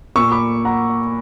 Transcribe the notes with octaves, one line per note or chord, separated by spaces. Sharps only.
A#2 A#3 C#6 E6
B5 D6
F#5 A#5